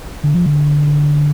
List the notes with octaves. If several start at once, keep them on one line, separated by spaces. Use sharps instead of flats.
D3
F3
D3